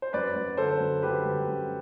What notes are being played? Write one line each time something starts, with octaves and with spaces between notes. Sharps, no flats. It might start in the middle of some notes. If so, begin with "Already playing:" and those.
C5
F#2 B4 D5
F#2
D3 A4 C5
F#2
D3 G4 B4
G3
F#2